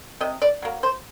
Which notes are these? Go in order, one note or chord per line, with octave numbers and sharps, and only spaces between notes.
C3 D#5
D5
F#3 A#3
C5